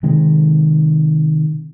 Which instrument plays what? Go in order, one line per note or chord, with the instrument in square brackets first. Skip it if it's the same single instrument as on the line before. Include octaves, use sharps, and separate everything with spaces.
[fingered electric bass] C3 D#3 G#3